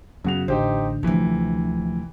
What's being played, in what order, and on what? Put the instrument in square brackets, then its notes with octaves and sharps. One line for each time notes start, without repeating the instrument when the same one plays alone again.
[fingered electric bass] F#2 [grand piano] C#3 F#4 F7 [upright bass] B3
[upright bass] A1 [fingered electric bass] D3 [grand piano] D#4 G4 C5
[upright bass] D2 F3 [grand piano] C3 E3